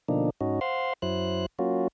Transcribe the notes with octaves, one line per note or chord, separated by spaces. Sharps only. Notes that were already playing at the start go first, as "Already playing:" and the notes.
B2 D3 F3 A#3 D4 D#4
G#2 C#4 D#4 F#4
C5 F5 F#5 C6
F#2 F#3 E4 C5 F#6
F#3 A#3 C#4 F4 F#4